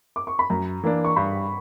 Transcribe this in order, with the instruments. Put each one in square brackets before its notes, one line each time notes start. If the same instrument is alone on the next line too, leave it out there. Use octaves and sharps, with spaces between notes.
[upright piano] D6
C#6
B5
[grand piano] F#2 [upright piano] A#5
[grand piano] E3 A#3 D4
[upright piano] C#6
[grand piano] G2 [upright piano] B5